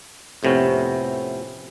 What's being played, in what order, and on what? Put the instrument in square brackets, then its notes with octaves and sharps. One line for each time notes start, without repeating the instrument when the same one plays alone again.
[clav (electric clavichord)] F2 A2 C3 B3 C#4